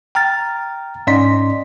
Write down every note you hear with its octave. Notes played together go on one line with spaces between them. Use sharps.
G5 A#5 F6 A6
G#2 C#4 D5 D#5 C6 B6